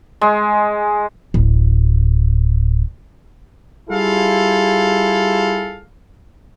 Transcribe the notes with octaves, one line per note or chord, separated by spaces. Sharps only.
G#3
D1 A1
G3 E4 F4 G#4 A4 F5